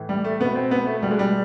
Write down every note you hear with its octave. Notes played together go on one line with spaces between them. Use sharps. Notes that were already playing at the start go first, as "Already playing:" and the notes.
Already playing: A2 E3
G3
A3
B2 B3
C4
B3
A3
B2 G3
G#3
G3